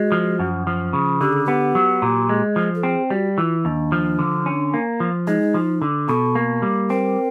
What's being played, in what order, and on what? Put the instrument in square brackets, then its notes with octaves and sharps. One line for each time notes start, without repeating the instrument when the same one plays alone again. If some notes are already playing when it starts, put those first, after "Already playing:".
Already playing: [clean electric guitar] G#3 [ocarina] F#4
[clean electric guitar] F3
F#2
F3
C#3
[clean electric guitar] D3 [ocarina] G4
[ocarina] G#4
[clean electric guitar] B3 [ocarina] G4
[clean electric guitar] F#3
A#2
G#3
F3
[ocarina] A4
[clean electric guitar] C4 [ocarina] G#4
[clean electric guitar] G3 [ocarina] F#4
[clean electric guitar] E3 [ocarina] F4
[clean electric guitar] D#2 [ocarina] D4
[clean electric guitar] F3
D3
C#4
A#3
F3
[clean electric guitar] G#3 [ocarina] D#4
[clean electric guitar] F3
D3
[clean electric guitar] B2 [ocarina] A4
[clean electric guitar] A#3
G3
[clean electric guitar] C4 [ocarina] A#4